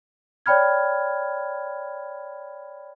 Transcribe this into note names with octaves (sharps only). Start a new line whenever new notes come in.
C#5 D5 G5 B5 F6 G#6